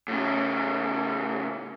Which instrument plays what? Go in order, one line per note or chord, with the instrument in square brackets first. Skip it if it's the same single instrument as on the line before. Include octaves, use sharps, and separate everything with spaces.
[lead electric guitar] A2 C#3